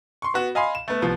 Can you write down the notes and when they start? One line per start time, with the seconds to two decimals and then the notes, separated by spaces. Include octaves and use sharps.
0.22 C6 C#6
0.34 B3 F#4
0.55 D#5 F5 G#5 B5 C6
0.75 E7
0.88 A3 B3
1.02 C2 F3 B3